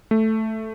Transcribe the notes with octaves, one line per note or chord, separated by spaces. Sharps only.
A3